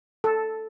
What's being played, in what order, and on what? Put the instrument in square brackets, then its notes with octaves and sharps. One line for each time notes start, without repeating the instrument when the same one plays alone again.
[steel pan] A4